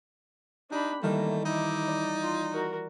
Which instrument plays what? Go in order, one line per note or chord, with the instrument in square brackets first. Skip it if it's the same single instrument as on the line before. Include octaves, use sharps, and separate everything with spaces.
[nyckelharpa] D4 B5 [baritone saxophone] D#4 [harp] G4
[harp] D#3 E3 G3 [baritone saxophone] A3 [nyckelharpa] A#3
[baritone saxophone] D#4 [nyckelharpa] E4 D6
[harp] D5
[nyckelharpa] F4
F#4 A#4